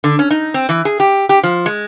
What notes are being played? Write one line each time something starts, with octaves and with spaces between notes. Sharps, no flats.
D3
C#4
D#4
C4
E3
G#4
G4
G4
F3
G#3